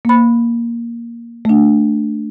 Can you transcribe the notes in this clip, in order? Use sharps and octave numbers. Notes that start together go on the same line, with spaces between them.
A#3 B5
A3 D4